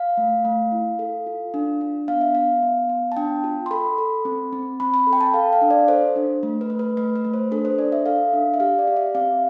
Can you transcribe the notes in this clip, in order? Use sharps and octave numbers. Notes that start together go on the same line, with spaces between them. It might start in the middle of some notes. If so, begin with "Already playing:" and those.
Already playing: F5
A3
A3
E4
A4
F4
D4
D4
B3 F5
E5
B3 F5
B3
B3
A5
D4 G5
F4
C6
A4 B5
A4
C4
C4
C4 B5
B5
A4
G5
A5
A4 F5
F5
D4
D5
A4 C5
D4
A3
B4
A3
B4
A3 B4
B4
A3
C5
D4 A4
C5
D4 D5
E5
A4 F5
D4
E5
G4 F5
D5
G4
E5
C4 F5